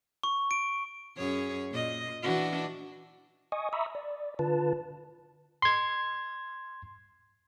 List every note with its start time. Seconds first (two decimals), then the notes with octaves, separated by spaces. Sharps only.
0.23 C#6
0.51 D7
1.17 F#2 G#4 C#5
1.72 A#2 D#5
2.22 E3 D4 F#4
3.52 D#5 G#5 C#6 D#6
3.73 E5 A#5 B5 C#6 D#6 E6
3.95 D5
4.39 D3 F4 B4 A5
5.62 C6 G#6